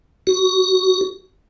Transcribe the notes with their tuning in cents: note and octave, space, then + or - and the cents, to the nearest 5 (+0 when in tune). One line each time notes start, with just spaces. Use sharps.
F#4 +10